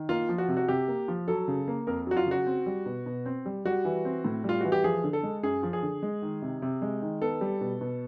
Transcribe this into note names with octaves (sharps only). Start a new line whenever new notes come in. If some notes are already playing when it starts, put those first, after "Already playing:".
Already playing: D#3
A#3 F4
F3
F#4
C3
F#4
C3 G4
A#3
F3
F#3 A4
C#3
A#3
F2 A#4
F#3 F#4
F4
C#3 F#4
C4
G3
B2
B2
C4
G3
G3 F#4
E3
C4
A2
G3 F4
E3 F#4
G4
F3 G#4
D3
A4
G#3
F#2 G#4
F3
G#4
D3
G#3
D#3
C3
C3
G#3
D#3
B3 A4
G3
B2
B2